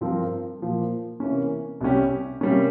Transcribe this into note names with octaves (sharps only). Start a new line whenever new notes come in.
G2 F3 C4 F4 A#4
A#2 F3 A#3
C3 E3 A#3 C#4
C2 C3 G3 C#4 G4
C3 G3 A#3 C#4